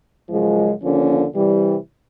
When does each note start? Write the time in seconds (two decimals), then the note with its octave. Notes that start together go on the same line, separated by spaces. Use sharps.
0.30 F#2 C#3 F3 G#3
0.82 D#2 D3 F3 A#3 C#4
1.34 C3 E3 G3